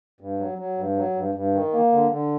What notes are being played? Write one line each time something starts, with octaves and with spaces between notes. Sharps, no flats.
G2
F#3
F#3
G2
F#3
G2
G2
D#3
A#3
D3
D3